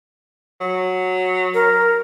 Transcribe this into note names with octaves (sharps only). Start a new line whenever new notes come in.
F#3
A#4